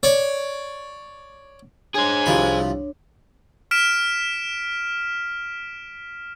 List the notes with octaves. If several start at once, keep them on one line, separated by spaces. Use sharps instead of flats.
C#5 D5
D4 G#4 C5 C#5 G#5
C2 F3 B5
F6 B6 D7 E7